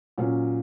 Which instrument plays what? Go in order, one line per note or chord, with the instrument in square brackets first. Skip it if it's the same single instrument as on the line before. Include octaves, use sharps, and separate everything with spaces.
[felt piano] A#2 F#3 C#4